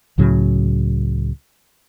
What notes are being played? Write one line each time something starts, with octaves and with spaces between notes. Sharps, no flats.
C#2 A2 C#3 F#3